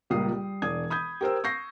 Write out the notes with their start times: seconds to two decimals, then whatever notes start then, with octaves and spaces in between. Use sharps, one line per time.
0.10 C#2 A#2 G3 A#3 D#6 C7
0.32 G3
0.62 E1 D5 D#6 G#6
0.90 B5 D#6 G6 G#6
1.21 G4 A#4 C5 E6
1.44 C#6 G6 A#6 C7